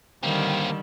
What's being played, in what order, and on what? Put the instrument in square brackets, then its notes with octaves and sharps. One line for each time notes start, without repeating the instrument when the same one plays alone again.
[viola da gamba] D3 D#3 G3 [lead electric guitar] A#3 C4